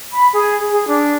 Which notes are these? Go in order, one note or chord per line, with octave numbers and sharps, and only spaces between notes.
B5
G#4
G#4
D4